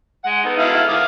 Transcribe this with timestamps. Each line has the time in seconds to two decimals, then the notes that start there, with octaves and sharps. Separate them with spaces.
0.24 G#3 F#5
0.44 B3 D#4 A4
0.58 E4 F5
0.89 F5 D6 D#6